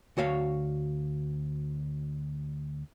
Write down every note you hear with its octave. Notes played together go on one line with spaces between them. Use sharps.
D2 F#4 C#5 F5